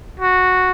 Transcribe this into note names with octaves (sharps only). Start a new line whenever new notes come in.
F#4